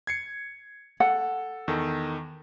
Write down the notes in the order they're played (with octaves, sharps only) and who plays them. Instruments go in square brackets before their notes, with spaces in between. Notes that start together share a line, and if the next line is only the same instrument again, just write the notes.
[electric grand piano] G#6 C7 C#7
[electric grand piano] A4 [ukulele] F#5
[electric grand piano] E2 D#3 A4